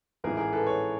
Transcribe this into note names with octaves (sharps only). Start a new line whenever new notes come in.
A1 G#2 E3 G#4 A#4
G#4 A#4
A4 B4
B4 C#5